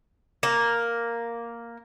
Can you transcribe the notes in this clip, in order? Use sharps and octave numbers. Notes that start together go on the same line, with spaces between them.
A#3